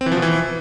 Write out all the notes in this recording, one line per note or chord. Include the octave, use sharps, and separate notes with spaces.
C4
E3
F3
B2
E3